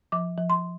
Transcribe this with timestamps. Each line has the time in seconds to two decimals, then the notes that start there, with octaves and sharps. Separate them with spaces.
0.12 F3 D6
0.38 F3
0.50 C6